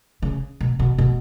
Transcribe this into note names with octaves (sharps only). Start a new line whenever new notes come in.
C#3
B2
B2
B2